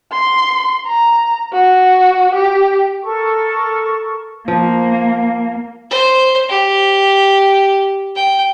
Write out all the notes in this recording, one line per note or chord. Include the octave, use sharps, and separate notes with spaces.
C6
A#5
F#4
G4
A4 A#4 C#6
F3 A#3
C5
G4
G5